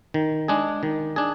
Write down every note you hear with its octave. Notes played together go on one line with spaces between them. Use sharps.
D#3
G#3 D4 G#4
D#3
D4 G#4